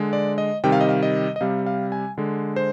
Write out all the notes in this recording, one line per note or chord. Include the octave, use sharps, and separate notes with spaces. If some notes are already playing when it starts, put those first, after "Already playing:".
Already playing: D3 G#3
D5
D#5
C3 D#3 G3 G5
F5
D#5
F5
D#5
D#5
C3 G3 F5
F5
G#5
D3 G#3
C5